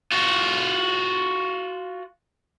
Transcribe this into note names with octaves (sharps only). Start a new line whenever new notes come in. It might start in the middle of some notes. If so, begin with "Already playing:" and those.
F4 F#4